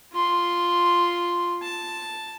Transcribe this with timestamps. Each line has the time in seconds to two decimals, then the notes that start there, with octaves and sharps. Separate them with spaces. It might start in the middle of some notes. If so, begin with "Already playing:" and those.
0.13 F4 C6
1.62 A5